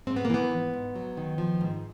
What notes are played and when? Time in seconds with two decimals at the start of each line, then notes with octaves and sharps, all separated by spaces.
0.07 G#2 C4
0.16 B3
0.25 A#3
0.30 E3 B3
0.51 G#2
0.74 G#2
0.95 F#3
1.17 D#3
1.38 F3
1.61 G#2